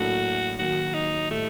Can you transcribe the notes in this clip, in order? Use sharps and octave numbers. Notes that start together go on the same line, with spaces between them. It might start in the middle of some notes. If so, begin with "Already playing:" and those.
Already playing: A2 F#3 A#3 D4 F#4 A4
D#3 F#3 A#3 F#4
D#4
A2 G3 A3